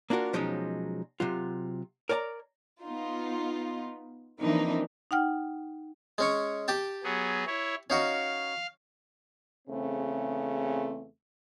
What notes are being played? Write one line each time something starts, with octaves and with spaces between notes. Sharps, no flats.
A#3 D4 F4 F#4 A#4
B2 F3 F#3 G#3 C#4 D#4
C3 F#3 F4
A#4 C#5 D5 G#5 A#5
B3 D#4 F4
E3 F3 A#3 C4 D4 D#4
D#4 F#5 G5 F6
G#3 C#4 C#5
G4 G5 A5
F#3 B3 G#4
E4 C#5
C#4 D#4 F#4 F5
E2 C#3 A3 C4